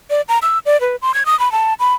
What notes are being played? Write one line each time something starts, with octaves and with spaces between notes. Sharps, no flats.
D5
A#5
E6
D5
B4
C6
G#6
D#6
B5
A5
B5